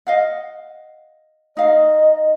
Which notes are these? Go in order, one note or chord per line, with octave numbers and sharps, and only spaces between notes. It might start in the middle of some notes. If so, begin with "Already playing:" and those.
D#5 F5 F#5
D#4 D#5 F5